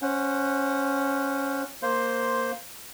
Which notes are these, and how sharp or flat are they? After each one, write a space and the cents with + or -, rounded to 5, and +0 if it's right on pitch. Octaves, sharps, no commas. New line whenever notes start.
C#4 +0 C5 +15 F#5 +0
A#3 +0 C5 +5 C6 +0